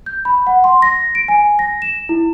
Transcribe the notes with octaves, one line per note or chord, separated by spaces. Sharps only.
G6
B5
F#5
C6
A#6
D7
G#5
A#6
E7
E4